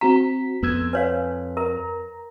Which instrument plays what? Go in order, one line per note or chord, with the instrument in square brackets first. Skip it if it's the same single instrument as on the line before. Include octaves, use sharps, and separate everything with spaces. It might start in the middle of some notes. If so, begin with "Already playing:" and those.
[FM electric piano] C4 F#4 B6 [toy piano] A#5
[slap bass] F2 [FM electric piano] B3 E6 G#6
[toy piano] B4 C#5 F5 [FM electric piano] G#5
[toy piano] A#4 [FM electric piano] A#5